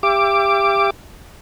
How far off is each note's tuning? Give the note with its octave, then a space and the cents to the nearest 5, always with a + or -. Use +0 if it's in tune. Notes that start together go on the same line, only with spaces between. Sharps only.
G4 +25 E5 +45 D6 +0